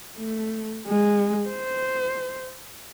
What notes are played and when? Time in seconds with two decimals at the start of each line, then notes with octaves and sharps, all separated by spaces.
0.18 A3
0.87 G#3
1.49 C5